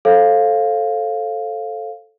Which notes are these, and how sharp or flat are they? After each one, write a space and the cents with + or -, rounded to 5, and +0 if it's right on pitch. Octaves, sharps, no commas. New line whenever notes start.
A4 +0 C5 +40 F5 +0